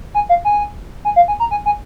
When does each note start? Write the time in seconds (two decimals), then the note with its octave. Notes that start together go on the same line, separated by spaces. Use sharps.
0.15 G#5
0.29 F5
0.45 G#5
1.05 G#5
1.16 F5
1.28 G#5
1.40 A#5
1.51 G#5
1.66 G#5